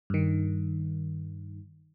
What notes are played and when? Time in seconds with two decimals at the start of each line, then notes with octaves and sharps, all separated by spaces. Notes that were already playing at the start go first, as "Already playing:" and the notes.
0.10 G2 D#3